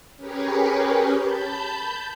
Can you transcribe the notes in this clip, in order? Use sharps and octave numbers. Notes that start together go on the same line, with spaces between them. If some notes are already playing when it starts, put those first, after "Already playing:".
C#4 G4 G#4 A#4 B4 C#5
A5 B5 G6